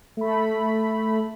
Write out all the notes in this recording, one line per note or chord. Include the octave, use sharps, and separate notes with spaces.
A3 B5